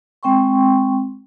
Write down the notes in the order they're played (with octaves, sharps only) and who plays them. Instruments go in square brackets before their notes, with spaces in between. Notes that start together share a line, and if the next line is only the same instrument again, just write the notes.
[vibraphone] G#3 C4 G5 C6 C#6